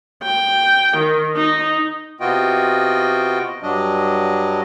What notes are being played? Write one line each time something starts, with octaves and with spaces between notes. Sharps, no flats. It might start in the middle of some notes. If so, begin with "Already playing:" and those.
G5
D#3
D#4
C3 B3 F4 F#4 D#5 G5
G2 F#3 D4 D#5